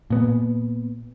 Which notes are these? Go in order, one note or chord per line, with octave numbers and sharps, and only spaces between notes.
A#2 B3